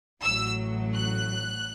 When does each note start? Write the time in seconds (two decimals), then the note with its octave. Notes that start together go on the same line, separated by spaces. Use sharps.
0.22 A1 A2 F#3 E6
0.94 F#6